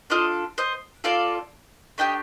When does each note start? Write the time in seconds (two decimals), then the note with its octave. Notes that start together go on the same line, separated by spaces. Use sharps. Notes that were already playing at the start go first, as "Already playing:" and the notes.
0.10 D4 F4 A4 C5 D#5
0.58 C5 D#5
1.04 C4 F4 A4 D5 F5
1.98 A3 D4 G4 D#5 G5